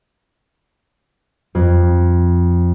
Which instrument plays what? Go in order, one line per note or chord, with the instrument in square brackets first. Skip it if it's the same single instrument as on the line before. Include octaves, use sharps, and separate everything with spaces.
[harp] F2